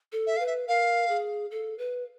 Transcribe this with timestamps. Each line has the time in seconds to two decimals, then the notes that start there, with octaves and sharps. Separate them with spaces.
0.12 A4
0.27 E5
0.36 B4 F5
0.46 E5
0.68 A#4 F5
1.09 G#4
1.51 A4
1.79 B4